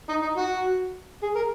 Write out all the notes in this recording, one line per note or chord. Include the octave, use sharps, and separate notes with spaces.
D#4
D#4
F#4
G#4
A#4